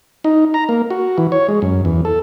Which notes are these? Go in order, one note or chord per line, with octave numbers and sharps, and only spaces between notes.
D#4
A#5
A#3
F#4
E3
C#5
G#3
F#2
E2
A4